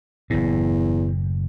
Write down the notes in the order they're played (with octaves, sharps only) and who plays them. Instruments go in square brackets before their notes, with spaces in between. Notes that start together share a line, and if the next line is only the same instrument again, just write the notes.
[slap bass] F#1 A2 [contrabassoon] E2